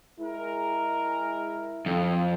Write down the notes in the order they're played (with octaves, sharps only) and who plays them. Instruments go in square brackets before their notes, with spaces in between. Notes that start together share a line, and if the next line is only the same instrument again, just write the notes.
[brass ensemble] G#3 A#4 [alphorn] E4
[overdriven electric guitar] F2